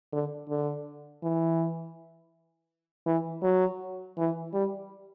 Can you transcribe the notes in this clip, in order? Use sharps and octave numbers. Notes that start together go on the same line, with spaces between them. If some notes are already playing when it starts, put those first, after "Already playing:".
D3
D3
E3
E3
F#3
E3
G3